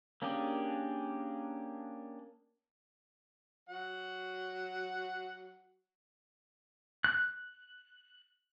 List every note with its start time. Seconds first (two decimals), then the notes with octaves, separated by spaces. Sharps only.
0.22 A#3 C#4 D4 G4 G#4
3.69 F#3 F#5
7.04 F#6